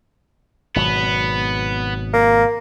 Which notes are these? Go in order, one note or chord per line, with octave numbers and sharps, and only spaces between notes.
G#1 B2 F#3 B3
A#3